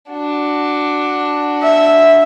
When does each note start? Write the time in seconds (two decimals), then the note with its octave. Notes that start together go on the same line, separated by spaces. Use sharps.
0.10 D4 F#4
1.63 E5